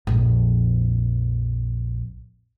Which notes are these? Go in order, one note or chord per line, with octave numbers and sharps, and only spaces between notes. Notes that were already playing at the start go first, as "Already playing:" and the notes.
A#1 F2